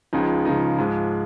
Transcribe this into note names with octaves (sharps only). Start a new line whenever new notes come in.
C#2 C#3 F3 G#3 D#4
C#2 C#3 F3 G#3 D#4
G#2 F3 G#3